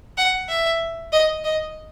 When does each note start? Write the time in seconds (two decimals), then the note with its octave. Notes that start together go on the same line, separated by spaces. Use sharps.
0.17 F#5
0.49 E5
1.12 D#5
1.44 D#5